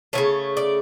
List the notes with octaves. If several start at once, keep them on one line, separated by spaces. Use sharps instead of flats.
C#3 E3 A3 C#5
D5